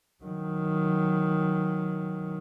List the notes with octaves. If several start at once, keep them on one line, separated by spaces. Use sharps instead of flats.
D#3 F#3